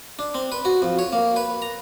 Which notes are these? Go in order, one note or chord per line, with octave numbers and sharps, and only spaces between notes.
D4
C4
B4
F#4
F2
C#5
A#3
B4
A#5